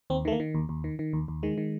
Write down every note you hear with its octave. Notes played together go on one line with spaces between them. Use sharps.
D#2 C4
D#3 A3
A#3
D#3
D#2
D#2
D#3
D#3
D#2
D#2
D#3 G#3
D#3